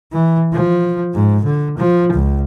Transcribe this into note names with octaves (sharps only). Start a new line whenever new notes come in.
E3
F3
G#2
D3
F3
C#2